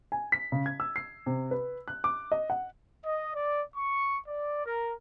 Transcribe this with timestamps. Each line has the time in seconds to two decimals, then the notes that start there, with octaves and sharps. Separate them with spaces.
0.12 G#5
0.32 B6
0.52 C#3
0.66 G#6
0.80 E6
0.96 C7
1.26 C3
1.51 B4
1.88 F#6
2.04 D6
2.32 D#5
2.50 F#5
3.05 D#5
3.35 D5
3.76 C#6
4.27 D5
4.66 A#4